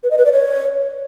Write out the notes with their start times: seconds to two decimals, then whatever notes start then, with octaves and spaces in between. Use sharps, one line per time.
0.03 B4
0.11 D#5
0.18 B4
0.25 D5
0.33 C#5